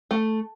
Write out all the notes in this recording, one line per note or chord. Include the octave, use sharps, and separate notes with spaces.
A3